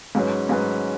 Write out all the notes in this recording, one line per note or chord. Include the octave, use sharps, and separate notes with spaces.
G#2 F#3 C#4 B4
G#2 F#3 C#4 B4